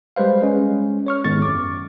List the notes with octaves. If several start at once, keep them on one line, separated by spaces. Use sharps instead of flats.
G3 G#3 B4 C5 F5
G#3 C#4
C#5 C#6 F6
G#1 G#3 B3 C#6 A6
F#2 D6